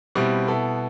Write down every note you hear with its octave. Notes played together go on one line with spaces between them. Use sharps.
B2 G3 C4 E4 G4
B2 B3 E4 A4